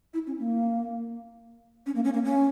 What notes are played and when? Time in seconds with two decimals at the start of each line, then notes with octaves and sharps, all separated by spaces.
0.14 E4
0.27 C#4
0.39 A#3
1.86 C#4
1.95 A#3
2.05 C#4
2.14 A#3
2.24 C#4